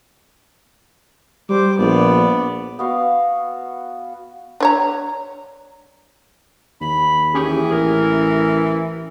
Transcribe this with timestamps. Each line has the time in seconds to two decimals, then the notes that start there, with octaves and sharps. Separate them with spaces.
1.49 G3 C5 D6
1.78 A#1 B3 D5
2.79 B3 F#4 F5
4.60 D4 C#5 A#5
6.81 D#2 B5
7.34 E3 C#4 G4 G#4
7.72 A1 A#4